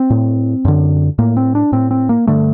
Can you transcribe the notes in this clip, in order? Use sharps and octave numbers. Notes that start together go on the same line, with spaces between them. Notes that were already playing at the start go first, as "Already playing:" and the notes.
Already playing: C4
A2
F#2 D3
A2 A#3
C4
D4
A2 C4
C4
A#3
G2 D3 A3